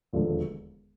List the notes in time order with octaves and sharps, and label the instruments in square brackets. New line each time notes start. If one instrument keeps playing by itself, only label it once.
[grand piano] E1 D#2 D3 F3 A3